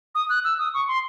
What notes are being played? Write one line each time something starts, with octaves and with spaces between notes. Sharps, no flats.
D#6
F#6
E6
D#6
C#6
C6